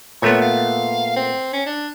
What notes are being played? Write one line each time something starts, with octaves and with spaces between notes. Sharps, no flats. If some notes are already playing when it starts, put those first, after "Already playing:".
A#2 A3 B3 C#5
F5
C4
C#4
D4